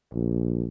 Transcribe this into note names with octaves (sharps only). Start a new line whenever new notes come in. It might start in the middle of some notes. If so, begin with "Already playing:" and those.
A#1